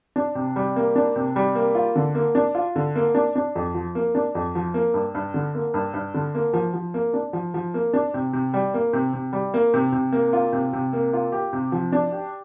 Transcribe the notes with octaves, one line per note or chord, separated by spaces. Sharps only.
D4
C3
G3
A#3
D4
C3
G3
A#3
F4
D3
A#3
D4
F4
D3
A#3
D4
D4
F2
F3
A#3
D4
F2
F3
A#3
G2
G2
D3
A#3
G2
G2
D3
A#3
F3
F3
A#3
D4
F3
F3
A#3
D4
C3
C3
G3
A#3
C3
C3
G3
A#3
C3
C3
A#3
F4
C3
C3
A#3
F4
G4
C3
F3
D4
G4